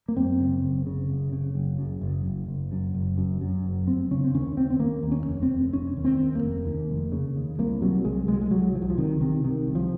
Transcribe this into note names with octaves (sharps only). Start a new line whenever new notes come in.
A#3
F#2 C4
C#3
F#1
C#3
F#1
C#3
F#1
F#2
F#1
F#1
F#1
F#2
F#1
F#2
F#2
F#1
F1 C4
C#3 C#4
C4
D#2 C#4
D#2 C4
C4
D#2 A#3
D#2
C#4
F1
C4
F1
F1 C#4
D#2
C4
D#2
A#3
F1
D#2
F1
C#3
D#2
C2 A#3
C3 F#3
C2 G#3
C2 G#3
G#3
C2 F#3
C2 F3
F#3
F3
C3 D#3
C3 D#3
C3 D#3
C2
F3